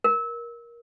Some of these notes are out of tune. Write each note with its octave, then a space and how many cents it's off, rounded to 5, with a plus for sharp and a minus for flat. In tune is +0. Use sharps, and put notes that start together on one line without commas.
A#4 +15